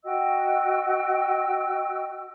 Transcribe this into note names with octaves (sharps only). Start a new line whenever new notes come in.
F#4 D#5 G5 E6